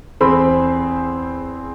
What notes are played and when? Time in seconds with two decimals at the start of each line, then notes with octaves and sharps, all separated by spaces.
0.21 E2 C4 G#4 C5 B5 E6